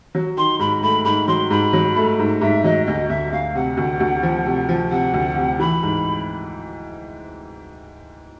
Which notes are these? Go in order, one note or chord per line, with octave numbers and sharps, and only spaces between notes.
F#3
D#3 C6
G#2 B5
A3 B5
G#2 B5
F#3 C6
G#2 B5
F#3
A3
G#2
G#2 E5
F#3 D#5
D2 D#5
D2 E5
D2 F5
C3 F#5
D2
D2
F3
C3
F3
C3 F#5
D2
C3
E3 B5
G#2